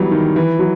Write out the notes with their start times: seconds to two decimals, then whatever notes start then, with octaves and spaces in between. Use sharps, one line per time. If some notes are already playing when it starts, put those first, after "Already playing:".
Already playing: E3 F#3 G3 B3
0.11 D#3
0.36 E3
0.59 F#3